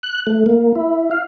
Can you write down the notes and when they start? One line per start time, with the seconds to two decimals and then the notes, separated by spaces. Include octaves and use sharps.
0.03 F#6
0.27 A3
0.46 A#3
0.75 E4
1.11 F5